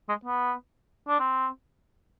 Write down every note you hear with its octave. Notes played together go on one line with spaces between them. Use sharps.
G#3
B3
D4
C4